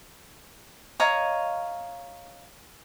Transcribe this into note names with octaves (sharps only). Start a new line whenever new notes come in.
C#5 D#5 F5 A#5